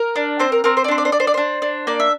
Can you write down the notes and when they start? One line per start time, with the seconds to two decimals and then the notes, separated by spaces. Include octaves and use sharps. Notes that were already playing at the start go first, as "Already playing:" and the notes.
Already playing: A#4
0.16 D4
0.39 C4 C5
0.52 A#4
0.64 C4 A#4
0.77 C5
0.84 D5
0.88 D4 C5
0.98 D5
1.05 C5
1.12 D4 D5
1.20 C5
1.27 D5
1.34 D4 C5
1.62 D4
1.87 A#3 D5
2.00 E5